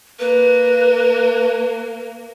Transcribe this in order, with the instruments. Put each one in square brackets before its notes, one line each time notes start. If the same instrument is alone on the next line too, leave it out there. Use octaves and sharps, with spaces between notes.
[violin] A#3 [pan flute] B4